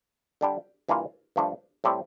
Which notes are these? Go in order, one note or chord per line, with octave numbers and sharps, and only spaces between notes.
D3 G3 D4 G4
G2 E3 A#3 F4
G2 F3 A3 D4 A4
A2 G3 C4 G4